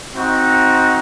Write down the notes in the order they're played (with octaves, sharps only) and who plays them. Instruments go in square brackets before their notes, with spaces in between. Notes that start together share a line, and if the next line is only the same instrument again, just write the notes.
[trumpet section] C4 D#4 F#4